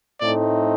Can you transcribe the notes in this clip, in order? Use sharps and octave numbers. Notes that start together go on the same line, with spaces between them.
A2 A3 C4 D#4 D5